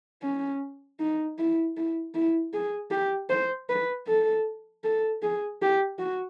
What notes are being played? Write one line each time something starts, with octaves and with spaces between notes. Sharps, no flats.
C#4
D#4
E4
E4
E4
G#4
G4
C5
B4
A4
A4
G#4
G4
F#4